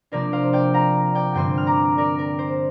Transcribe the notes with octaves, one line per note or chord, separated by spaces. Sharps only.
C3 F3 A#3 D4 A#4 D5
C5 F5
D5 G5
F5 A#5
D5 G5
G2 D3 G3 C4 G5 C6
F6
A#5 D6
A#4 D5
A#4
C5